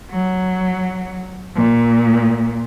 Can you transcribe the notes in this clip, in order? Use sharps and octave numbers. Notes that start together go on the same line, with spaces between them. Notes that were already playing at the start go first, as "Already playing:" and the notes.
F#3
A#2